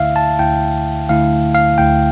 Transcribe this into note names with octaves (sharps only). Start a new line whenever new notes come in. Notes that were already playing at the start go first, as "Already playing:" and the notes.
Already playing: D2 D3 A3 E4 E5 F5
A5
D2 D3 A3 E4 G5
D2 D3 A3 E4 F5
F5
D2 D3 A3 E4 G5